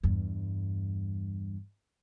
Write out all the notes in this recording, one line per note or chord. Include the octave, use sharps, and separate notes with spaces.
E2 G2